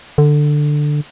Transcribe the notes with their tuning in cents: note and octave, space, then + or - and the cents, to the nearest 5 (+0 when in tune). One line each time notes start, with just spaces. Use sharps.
D3 +10